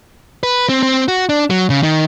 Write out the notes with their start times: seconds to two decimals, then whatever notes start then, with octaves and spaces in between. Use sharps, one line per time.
0.43 B4
0.69 C4
0.83 C4
1.08 F#4
1.29 D4
1.50 F#3
1.70 C#3
1.83 D#3